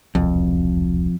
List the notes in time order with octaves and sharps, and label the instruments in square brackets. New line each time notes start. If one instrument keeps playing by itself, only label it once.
[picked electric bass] E1 C2 [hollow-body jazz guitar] F2